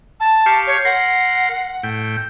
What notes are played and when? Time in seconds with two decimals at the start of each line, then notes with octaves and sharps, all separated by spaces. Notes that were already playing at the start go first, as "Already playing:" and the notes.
0.20 A5
0.46 G4 F5 C#6
0.67 C#5
0.85 A#4 F#5 C6
1.83 A2 G5